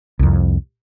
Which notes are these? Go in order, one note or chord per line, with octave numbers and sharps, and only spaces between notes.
C2 F2